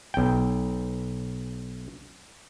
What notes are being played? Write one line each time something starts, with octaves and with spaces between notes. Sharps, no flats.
B1 G5